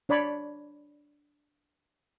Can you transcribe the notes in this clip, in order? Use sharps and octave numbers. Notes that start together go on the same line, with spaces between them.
D4 C#5 D5 B5